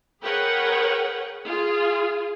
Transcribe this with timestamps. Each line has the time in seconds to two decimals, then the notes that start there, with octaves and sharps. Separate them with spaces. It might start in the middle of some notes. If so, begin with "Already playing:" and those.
0.23 G#4 A#4 B4 C#5 F#5 G5
1.46 F4 G#4